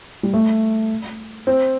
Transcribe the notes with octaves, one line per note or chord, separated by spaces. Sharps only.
G3
A3
C4